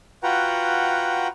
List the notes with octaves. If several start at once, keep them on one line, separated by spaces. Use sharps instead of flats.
F4 F#4 B4 F#5 G5 A#5